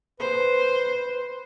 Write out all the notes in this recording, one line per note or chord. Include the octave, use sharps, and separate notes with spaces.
B4 C5